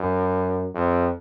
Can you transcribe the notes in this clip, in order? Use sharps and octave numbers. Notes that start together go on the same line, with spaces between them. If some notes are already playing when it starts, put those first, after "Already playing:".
Already playing: F#2
F2